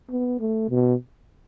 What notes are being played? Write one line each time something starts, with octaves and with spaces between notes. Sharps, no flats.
B3
A3
B2